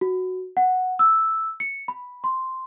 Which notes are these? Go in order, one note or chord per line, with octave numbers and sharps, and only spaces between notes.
F#4
F#5
E6
C#7
B5
C6